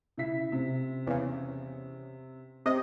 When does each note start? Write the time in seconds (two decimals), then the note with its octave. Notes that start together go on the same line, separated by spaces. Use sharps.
0.18 C#3 E4 B6
0.52 C3
1.07 E2 C#3
2.66 C3 G4 D#5